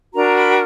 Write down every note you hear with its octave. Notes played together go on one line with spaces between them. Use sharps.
D4 F#4 A#4 A#5
B5